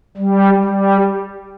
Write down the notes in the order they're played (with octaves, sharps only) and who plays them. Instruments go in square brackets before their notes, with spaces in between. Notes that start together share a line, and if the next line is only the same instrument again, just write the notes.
[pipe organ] G3
G3